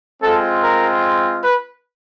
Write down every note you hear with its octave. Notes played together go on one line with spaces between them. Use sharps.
G#3 C4 F4 A4
A#4
B4